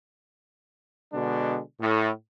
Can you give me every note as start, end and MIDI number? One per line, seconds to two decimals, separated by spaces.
1.11 1.58 47
1.11 1.58 50
1.11 1.58 56
1.11 1.58 62
1.79 2.08 45